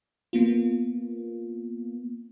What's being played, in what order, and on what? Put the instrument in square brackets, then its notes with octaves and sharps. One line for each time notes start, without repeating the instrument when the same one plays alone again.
[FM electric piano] A#3 B3 F4